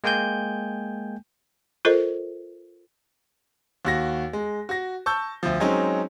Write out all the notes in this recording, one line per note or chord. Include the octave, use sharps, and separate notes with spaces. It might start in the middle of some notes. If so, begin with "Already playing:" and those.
G#3 A#3 G5 G#5 G6
F4 A4 A#4 C5 D#5
D#2 F#4 A#6
G#3
F#4 A#6
A5 C#6 E6 G6
D2 F3
F#3 G#3 C4 C#4 D#4